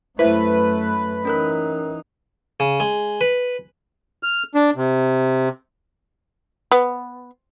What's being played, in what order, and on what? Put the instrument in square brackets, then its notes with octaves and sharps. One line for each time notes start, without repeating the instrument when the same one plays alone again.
[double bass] F#2 A3 [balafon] E4 C5 E5 [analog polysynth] B4
[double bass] E3 D#4 [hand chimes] C#4 A#4 F#6
[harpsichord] C#3
G#3
B4
[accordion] F6
D4
C3
[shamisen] B3